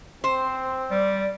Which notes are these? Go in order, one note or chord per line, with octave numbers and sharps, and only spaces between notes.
C4 C5
G3 D5